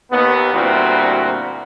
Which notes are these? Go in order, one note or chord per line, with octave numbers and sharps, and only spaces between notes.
D#2 B3
D2 A#2 G3 C4 E4 F#4